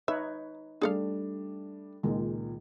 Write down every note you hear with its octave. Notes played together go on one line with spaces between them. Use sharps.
D#4 B4 C#5 E5
G3 A3 D4 G#4 A4 F5
C#2 A#2 D#3 G#3